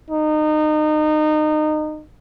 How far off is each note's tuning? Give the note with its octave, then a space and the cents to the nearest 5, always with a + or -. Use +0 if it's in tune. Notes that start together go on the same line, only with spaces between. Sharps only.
D#4 -25